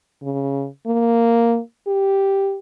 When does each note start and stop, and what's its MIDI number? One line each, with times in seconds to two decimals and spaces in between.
0.23 0.67 49
0.87 1.59 58
1.87 2.58 67